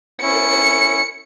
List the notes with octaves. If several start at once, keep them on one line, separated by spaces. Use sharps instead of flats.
C#4 E4 C#7